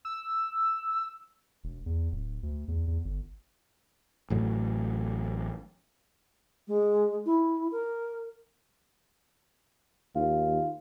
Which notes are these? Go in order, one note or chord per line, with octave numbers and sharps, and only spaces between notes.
E6
E1
E2
D1
D2
E2
E2
G1
A1 A2 F#3
G#3
E4
A#4
D#2 F4